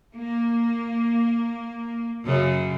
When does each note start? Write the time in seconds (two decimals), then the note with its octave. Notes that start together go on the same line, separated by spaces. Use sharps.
0.14 A#3
2.25 F#2 C#3